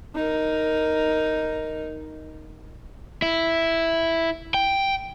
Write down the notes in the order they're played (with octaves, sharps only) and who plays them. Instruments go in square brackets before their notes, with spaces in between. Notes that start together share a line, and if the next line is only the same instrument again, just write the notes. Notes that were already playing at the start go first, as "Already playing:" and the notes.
[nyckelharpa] D#4 A#4
[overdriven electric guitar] E4
G5